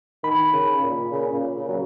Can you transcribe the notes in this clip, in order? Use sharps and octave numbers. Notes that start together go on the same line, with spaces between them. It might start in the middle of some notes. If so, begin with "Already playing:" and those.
D#3 B5
C#3
A#2
C#3
A#2
C#3
F#3